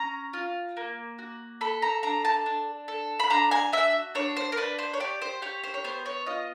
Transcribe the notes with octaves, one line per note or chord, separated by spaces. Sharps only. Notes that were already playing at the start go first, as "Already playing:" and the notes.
Already playing: C#4 A#5
F4
A#3
F#4
A4 B5
A#5
D4 A#5
A5
D4
A4
B5
D4 A#5
G#5
F#4 E5
D4 C#5
C5
A#4
D4 B4
C5
C#5
G4 D5
C5
G4 C#5
C5
C#5
B3 C5
C#5
F4 D#5